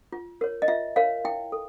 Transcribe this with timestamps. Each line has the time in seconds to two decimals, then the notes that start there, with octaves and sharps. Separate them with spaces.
0.12 F4
0.41 A#4 C#5
0.62 D#5
0.68 F4 E5
0.96 A#4 C#5 F5
1.25 E4 G5
1.52 A4